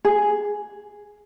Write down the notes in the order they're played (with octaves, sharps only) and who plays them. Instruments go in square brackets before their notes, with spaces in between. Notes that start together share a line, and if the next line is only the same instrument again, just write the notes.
[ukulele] G#4